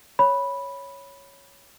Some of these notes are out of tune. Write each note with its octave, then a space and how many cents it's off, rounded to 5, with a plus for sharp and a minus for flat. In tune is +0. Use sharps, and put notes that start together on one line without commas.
C#5 +0 B5 -5